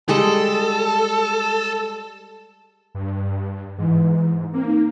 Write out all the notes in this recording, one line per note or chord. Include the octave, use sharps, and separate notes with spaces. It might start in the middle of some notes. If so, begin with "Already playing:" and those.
G3 G#3 A4 D#5 A5
G2
G#2 E3
A#3 C4
D#4